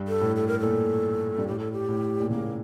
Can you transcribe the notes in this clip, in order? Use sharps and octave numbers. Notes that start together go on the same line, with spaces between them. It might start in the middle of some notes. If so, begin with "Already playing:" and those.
Already playing: G2
A4
A2
A4
A#4
A#2 A4
G2
A2 G4
A4
G4
A2
A#2
C#3 A#3